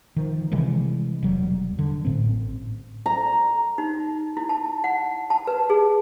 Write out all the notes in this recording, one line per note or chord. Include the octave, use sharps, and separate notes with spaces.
D#3 F3
C3 E3 G3 G#3
E1 F#3 G3
D3
A1 A2 C4
A#5
D#4
E4
A5
F#5
A5
B4
G#4